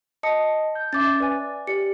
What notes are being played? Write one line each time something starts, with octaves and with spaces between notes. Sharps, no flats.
D#5 A5 D#6 C#7
G6
C#4 E5 D6 A6
B4 D5 G#5
G4 D5 C#7